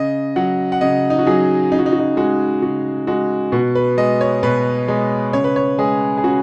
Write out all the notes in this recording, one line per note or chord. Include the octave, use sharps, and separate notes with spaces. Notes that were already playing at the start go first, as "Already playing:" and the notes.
Already playing: C#3 D#5
F#3 F#5
F#5
C#3 D#5
D#4
F#4
F#3 G#4
C#3 D#4
F#4
D#4
F#4
D#4
G#3 F#4
C#3 F#4
G#3 F#4
B2 F#4
B4
G#3 D#5
C#5
B2 B4
G#3
C#3 C#5
B4
C#5
G#3 G#4
G#4
C#3 F#4